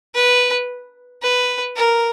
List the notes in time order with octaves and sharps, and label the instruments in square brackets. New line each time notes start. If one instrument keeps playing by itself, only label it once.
[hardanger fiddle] B4
B4
A#4